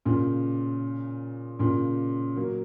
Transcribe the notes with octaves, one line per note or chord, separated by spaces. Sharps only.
A#2 C#3
A#2 C#3
F#3 A#3